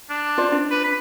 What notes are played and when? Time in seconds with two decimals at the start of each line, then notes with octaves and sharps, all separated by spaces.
0.10 D4
0.38 F4 C5 D5
0.52 D4
0.71 B4
0.84 B5